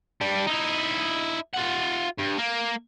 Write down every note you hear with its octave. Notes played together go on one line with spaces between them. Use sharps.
G3 D4
D#4 E4
F4 F#5
G2
A#3